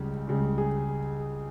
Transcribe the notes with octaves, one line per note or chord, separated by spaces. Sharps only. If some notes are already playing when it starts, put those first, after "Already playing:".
Already playing: C#2 C#3 G3
C#2 C#3 G3
G#4